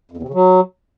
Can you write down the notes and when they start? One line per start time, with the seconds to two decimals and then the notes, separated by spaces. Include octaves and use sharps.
0.12 F2
0.17 E2
0.23 C3
0.28 C#3
0.34 F#3